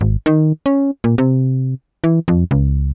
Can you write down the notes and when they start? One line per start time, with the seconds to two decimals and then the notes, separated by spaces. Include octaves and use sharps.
0.01 G#1
0.26 D#3
0.66 C#4
1.04 A#2
1.18 C3
2.04 E3
2.28 F2
2.51 C#2